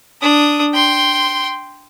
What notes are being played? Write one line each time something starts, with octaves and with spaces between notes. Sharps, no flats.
D4 D#6
G5 C6